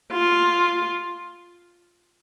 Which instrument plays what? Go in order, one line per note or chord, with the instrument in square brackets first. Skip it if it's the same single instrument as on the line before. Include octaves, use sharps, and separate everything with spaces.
[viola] F4